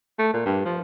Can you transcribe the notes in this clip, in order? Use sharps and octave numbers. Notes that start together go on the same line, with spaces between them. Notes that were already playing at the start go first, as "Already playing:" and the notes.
A3
A#2
G2
F3